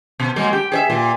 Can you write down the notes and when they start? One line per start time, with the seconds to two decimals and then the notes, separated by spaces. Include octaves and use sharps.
0.20 B2
0.36 F#3 G#3 A#3
0.53 G4
0.72 G#4 C#5 E5
0.90 A#2